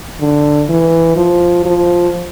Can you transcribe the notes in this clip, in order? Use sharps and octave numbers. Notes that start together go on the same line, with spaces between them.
D3
E3
F3
F3